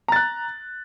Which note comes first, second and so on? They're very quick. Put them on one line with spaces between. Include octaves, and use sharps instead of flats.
A#5 A6 F#6